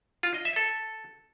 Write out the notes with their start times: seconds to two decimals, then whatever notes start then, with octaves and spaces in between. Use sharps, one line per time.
0.23 F4
0.34 D#5
0.45 E5
0.56 A4